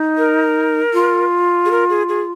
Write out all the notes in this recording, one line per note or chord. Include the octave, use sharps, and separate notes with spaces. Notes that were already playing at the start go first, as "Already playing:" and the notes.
Already playing: D#4
A#4
F4
G#4
A#4
G#4
G#4